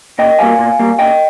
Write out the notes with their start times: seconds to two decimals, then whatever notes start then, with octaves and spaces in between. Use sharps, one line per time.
0.19 A#2 D#5 G5
0.39 G3 A#3 F5 G#5
0.59 A#2
0.79 G3 A#3
0.99 A#2 D#5 G5